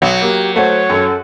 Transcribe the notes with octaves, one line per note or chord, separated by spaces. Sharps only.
B1 F#3
A#3 G4
A3 F#4 C5 C#5
F#2 A4